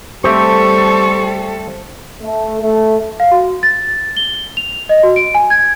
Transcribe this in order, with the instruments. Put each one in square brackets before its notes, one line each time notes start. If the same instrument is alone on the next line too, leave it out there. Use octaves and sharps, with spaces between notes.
[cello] G3 A4 [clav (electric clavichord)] A3 C4 G4 [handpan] C5 [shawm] C#6
[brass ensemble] A3
A3
[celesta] F5
F#4
A6
G7
F7
D#5
F#4
D7
G#5
G#6